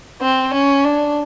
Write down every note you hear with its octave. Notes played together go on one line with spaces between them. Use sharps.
C4
C#4
D4